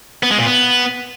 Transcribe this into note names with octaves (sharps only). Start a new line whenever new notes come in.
B3
G#3
A#2
B3